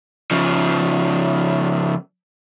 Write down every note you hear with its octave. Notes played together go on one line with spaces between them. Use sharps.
C#3 F3